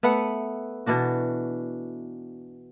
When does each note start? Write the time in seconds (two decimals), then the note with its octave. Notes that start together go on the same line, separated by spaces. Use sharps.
0.03 A3 B3 B4 F#5
0.86 B2 E3 D4 F#4